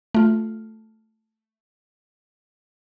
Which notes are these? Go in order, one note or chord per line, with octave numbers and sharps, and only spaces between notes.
A3 F4